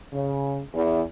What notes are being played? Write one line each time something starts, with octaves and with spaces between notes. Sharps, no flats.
C#3
E2